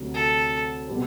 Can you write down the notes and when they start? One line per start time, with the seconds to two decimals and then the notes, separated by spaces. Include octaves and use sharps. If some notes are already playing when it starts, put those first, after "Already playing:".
Already playing: D2 C3 F#3
0.14 A4
0.88 B2 G3 C4